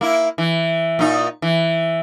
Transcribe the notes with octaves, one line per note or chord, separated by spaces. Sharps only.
A#3 E4
E3
A#2 D#4
E3